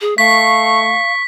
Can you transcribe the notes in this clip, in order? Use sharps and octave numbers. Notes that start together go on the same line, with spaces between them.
G#4
A3 F5 C#6 B6